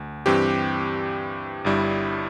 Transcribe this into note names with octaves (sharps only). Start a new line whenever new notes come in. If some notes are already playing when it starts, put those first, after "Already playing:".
Already playing: D2
G2 E3 C4 G4
G1 G2 G3 E4